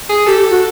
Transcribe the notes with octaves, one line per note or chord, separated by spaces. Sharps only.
G#4
G4 A4
G4
F#4